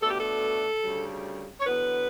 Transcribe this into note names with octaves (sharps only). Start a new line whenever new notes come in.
B2 A3 D4 A4
G4
A4
D2 C#3 G3
C#5
E2 D3 F#3 B3 B4